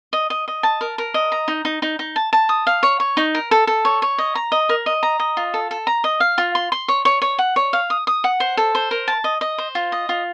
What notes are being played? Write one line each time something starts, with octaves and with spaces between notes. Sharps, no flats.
D#5
D#5
D#5
A5
A#4
A#4
D#5
A#5
D#4
D#4
D#4
D#4
A5
A5
D#6
F5
C#5
C#5
D#4
A#4
A4
A4
C#5
C#5
D#5
A#5
D#5
A#4
D#5
A#5
D#5
F4
A4
A4
A#5
D#5
F5
F4
C6
C6
C#5
C#5
C#5
F#5
C#5
F5
D#6
D#6
F#5
C5
A4
C5
A#4
A5
D#5
D#5
C5
F4
D#5
F4